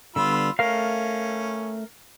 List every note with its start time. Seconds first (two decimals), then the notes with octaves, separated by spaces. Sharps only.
0.16 D3 G3 B3 F4 B5 E6
0.59 A3 C#4 A#4 F5